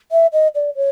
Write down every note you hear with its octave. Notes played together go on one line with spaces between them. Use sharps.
E5
D#5
D5
C#5